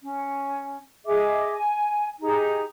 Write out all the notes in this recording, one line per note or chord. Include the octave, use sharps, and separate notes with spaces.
C#4
G#4 D#5 E5 D6
G#5
D#4 G4 G#4 A#5